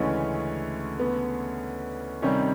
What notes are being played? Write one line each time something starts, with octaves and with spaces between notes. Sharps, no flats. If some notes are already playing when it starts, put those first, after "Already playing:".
Already playing: D2 C#3 E3 G#3 A3 C#4
B3
C3 D#3 G3 C#4